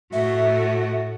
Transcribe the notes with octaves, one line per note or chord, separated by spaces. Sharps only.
A2 F#4 E5